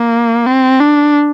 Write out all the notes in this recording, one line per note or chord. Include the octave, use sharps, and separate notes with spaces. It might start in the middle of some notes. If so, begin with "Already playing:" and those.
Already playing: A#3
C4
D4